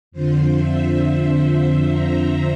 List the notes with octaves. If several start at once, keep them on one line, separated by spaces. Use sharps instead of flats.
F2 D3 F3 C5
E5
E5
A#5